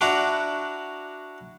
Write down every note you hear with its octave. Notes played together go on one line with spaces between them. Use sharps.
D4 E4 F#4 F#5 A#5 D6